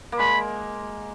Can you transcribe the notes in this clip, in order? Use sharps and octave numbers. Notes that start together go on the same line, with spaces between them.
A#3
G#3 B5